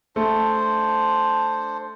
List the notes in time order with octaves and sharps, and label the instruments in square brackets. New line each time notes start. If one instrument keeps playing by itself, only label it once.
[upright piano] A3 [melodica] D4 C5